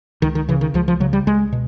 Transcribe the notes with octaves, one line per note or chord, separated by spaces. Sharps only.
C#2 D#3
D#3
C#3 E3
D#3
C#2 F3
F3
C#3 F#3
G3
C#2 G#3
B2